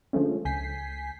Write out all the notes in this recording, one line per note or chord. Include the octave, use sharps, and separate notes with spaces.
D3 F3 G#3 A3 C#4
C#2 G#5 G6 B6 C7